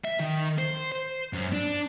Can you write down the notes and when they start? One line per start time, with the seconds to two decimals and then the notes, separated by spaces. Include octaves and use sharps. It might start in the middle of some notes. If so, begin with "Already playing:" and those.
0.05 E5
0.20 D#3
0.59 C5
0.92 C5
1.33 F#2
1.53 D4